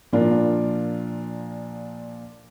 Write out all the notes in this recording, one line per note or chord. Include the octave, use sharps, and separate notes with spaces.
A#2 F3 D4 F4 A#4